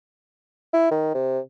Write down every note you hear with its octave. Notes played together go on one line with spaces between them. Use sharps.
E4
D#3
C3